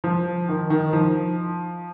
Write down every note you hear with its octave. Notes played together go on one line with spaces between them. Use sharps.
F3
D#3
D#3
F3